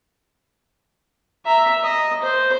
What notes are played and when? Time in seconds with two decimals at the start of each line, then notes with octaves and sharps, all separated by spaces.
1.46 E5 A#5
1.83 D#5
2.22 C5